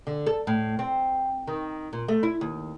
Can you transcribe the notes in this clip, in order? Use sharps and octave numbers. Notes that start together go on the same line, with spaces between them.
D3
A4
A2
C4
D#3
A#2
A3
E4
D#2